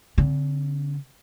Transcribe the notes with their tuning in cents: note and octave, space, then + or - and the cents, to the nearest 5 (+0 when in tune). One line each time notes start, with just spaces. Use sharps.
D3 -35 C4 +0